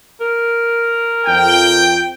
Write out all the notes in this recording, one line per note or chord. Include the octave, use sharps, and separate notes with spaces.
A#4
F2 G5